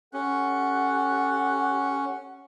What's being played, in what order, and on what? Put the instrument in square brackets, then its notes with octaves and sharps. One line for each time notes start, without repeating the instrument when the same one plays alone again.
[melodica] C#4 [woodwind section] G4 A4 F#5